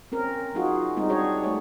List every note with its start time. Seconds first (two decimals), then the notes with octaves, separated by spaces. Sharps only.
0.12 C4 C#4 A#4
0.54 F#3 D#4 F4 F#4 G#4
0.97 G3 G#3 C4 D#4
1.10 D4 F#4 G#4 C#5
1.44 G#3 A3 C#5